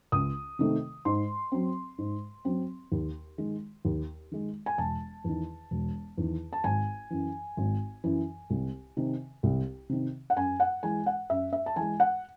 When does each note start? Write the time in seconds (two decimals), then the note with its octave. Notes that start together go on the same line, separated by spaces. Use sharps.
0.12 C#2 D#6
0.59 C3 D#3 A3
1.05 G#2 C6
1.52 F#3 C4
1.98 G#2
2.45 F#3 C4
2.92 D#2
3.38 D#3 G#3
3.85 D#2
4.31 D#3 G#3
4.66 G#5
4.78 E1 A5
5.24 E2 D#3
5.71 E1
6.17 E2 D#3
6.53 A5
6.64 G#1 G#5
7.10 F#2 E3
7.57 G#1
8.04 F#2 E3
8.50 C2
8.97 C3 D#3
9.43 C2
9.89 C3 D#3
10.30 F#5
10.36 F#2 G#5
10.60 F#5
10.83 E3 G#3 G#5
11.06 F#5
11.29 F#2 E5
11.53 E5
11.66 A5
11.76 E3 G#3 G#5
12.00 F#5